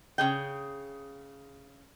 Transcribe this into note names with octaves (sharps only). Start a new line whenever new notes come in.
C#3 G#4 G5